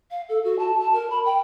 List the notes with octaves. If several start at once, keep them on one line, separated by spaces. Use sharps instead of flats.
F5
A4
F#4
A5
A5
A#4
B5
G5